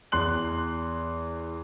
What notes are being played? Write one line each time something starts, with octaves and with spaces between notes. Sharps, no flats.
E2 C6 F#6 F#7